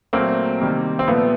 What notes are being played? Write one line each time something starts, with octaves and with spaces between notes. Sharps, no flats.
A#2 F#3 A3 A#3 C4
C3 D#3 G3
C4
A#2 F3 A3 B3